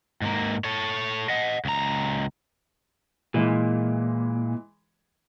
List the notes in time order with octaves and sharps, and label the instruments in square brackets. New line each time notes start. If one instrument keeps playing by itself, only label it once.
[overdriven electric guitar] G#2 A#3
A4 C#5
D#5 F#5
C#2 A#5
[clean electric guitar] A#2 [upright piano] E3 G#3